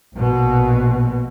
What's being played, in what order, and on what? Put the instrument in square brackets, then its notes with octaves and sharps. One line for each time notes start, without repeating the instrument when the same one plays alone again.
[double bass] A#1 B2